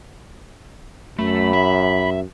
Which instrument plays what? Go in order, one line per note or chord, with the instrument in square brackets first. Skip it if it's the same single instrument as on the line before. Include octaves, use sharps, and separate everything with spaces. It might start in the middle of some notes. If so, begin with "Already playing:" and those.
[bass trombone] F#2 [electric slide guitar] A3 [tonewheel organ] B5
[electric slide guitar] E5